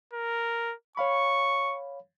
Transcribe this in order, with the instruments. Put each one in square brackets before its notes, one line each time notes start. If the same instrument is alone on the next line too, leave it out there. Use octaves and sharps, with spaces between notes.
[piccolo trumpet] A#4
[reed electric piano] C#5 F5 B5 [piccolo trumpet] C#6